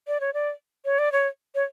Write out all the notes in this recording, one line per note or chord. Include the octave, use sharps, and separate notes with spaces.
D5
C#5
D5
C#5
D5
C#5
C#5